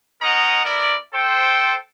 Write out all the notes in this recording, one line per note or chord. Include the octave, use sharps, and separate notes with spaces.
C#4 D#4 A#4 D#5 F#5 A#5
B3 E4 A#4 D5
A4 C5 G5